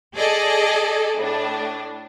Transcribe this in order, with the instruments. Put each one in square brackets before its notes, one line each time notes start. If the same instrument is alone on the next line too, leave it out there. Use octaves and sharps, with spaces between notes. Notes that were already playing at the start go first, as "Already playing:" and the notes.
[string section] G#4 A4 D5 D#5
A2 D4